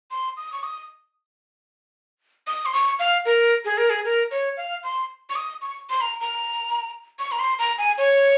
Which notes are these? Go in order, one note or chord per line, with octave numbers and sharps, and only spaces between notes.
C6
D#6
C#6
D#6
D#6
C6
C#6
F5
A#4
G#4
A#4
G#4
A#4
C#5
F5
C6
C#6
D#6
C#6
C6
A#5
A#5
C#6
A#5
C6
A#5
G#5
C#5